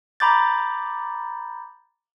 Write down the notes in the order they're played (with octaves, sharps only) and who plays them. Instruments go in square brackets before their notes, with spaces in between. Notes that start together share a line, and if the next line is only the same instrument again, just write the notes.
[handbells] A#5 B5 D6 G6 A6